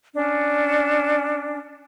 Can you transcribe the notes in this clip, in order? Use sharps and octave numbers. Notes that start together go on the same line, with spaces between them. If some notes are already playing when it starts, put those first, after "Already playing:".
C#4 D4